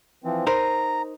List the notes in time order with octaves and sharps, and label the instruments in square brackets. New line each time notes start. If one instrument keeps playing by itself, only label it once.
[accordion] E3 F3 C4
[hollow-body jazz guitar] D#4 A#4 C5 [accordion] A#5